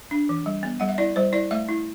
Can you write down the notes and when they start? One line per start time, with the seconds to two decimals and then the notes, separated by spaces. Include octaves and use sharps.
0.11 D4
0.29 E3
0.46 G3
0.63 B3
0.80 G3 F#5
0.89 E5
0.98 E4 D5
1.16 G3 C5
1.33 E4 D5
1.51 A3 E5
1.69 E4